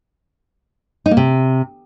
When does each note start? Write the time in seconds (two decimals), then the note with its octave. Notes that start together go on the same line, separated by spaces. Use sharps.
1.06 D#4
1.11 A#3
1.17 C3